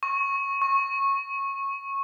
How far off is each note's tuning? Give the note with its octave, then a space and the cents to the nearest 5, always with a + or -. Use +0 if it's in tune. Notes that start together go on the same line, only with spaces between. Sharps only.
C#6 -15
C#6 -20